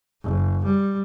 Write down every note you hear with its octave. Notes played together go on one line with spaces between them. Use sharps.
F#1
G3